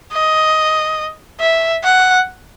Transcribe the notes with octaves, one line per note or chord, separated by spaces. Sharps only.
D#5
E5
F#5